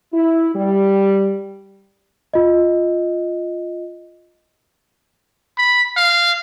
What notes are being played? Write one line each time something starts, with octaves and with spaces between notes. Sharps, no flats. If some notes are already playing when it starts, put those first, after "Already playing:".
E4
G3
F4 D#5
B5
F5